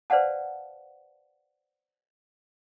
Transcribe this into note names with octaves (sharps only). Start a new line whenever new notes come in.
B4 C5 D5 F5 F#5 A5